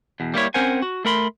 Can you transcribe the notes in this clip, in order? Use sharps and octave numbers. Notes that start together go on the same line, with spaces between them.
E2 B2
G3 A#3 E4 C#5
C4 C#4 A#4 C5 F#5 G#5
F#4
A3 A#4 B5 C6